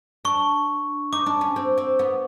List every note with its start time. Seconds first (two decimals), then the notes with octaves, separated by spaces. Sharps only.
0.25 D4 C#6
1.12 D#4 D6
1.26 D4
1.41 C#4
1.56 C4
1.78 C4
1.99 B3